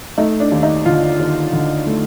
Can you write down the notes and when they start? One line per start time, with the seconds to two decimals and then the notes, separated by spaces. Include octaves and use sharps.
0.18 A3 D#4
0.40 D4
0.52 D#2
0.63 D#4
0.85 D3 F4
1.19 D#2
1.53 D3
1.87 A3